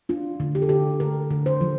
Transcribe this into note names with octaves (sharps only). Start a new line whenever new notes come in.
D4 F4
D3
G4
A4
D3 G4
D3 A#4
D3
C5
F3